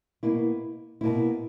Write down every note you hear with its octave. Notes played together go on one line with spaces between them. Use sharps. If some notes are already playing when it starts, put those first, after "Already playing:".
B2 A#3 E4
B2 A#3 E4